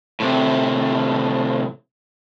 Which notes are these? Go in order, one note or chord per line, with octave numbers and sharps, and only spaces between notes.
A2 C3